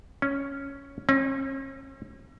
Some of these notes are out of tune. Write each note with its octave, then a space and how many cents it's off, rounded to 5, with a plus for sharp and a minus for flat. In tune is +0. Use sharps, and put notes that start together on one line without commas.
C#4 +0
C#4 -45